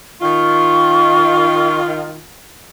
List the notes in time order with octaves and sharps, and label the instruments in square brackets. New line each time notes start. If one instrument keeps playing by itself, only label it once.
[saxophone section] D#3 F4 [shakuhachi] C#6